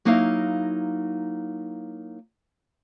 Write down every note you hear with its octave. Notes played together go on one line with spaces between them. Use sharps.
F#3 A#3 D#4 E4 F5